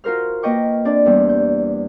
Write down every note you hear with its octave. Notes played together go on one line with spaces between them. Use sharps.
F4 F#4 A#4 C5 F6
A#3 B4 D#5 G5 C#6 D6
C4 D4 D5
E2 G3 C4
G6